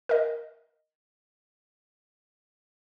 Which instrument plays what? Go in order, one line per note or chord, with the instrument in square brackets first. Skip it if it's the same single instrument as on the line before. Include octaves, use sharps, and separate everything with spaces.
[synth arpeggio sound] A#4 D#5